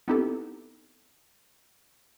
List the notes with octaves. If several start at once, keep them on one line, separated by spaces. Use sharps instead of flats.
B3 C4 D#4 E4 G4 A4